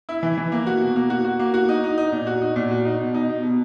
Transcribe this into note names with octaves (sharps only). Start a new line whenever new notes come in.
E4
E3
E3
A#3
F#4
B2
A#3
F#4
F#4
A#3
F#4
D#4
D#4
D#4
A#2
F#4
D#4
A#2
F#4
D#4
B2
D#4
B2
B2